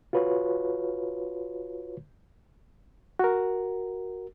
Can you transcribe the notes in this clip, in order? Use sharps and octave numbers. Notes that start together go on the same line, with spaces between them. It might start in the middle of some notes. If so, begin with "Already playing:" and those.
F4 F#4 B4 C#5
F#4 A#4